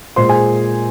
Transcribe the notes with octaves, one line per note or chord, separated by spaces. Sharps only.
A#2 G#3 C5 C6
G#4 G#5